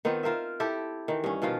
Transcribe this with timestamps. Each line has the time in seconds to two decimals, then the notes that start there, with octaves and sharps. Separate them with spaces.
0.05 D#3 B3 C4 F4
0.23 F4 A#4 C5 E5
0.60 E4 G4 A4
1.08 D#3 E3
1.24 G2 C#4
1.42 B2 D#3 F3 F4